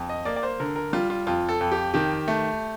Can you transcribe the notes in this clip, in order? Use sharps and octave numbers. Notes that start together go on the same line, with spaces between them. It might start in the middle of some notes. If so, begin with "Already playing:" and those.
Already playing: F2
D#5
A#3 D5
D5
C5
D3 A#4
A#4
G3 F4
F4
F2 F4
A4
F2
G4
D#3 G4
A3